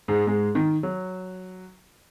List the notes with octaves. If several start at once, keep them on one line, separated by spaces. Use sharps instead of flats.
G#2 G#3
G#2 G#3
D#3
F#3